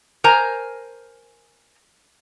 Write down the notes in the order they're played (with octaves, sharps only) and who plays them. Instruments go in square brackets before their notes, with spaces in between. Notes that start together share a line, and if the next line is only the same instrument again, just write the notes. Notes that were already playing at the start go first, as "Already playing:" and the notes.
[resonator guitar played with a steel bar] A#4 C5 G#5 A#5